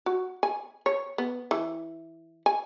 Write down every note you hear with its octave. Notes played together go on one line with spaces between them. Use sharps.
F#4
G#5
C#5
B3
E3
G#5